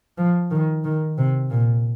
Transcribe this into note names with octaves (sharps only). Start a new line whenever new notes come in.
F3
D#3
D#3
C3
A#2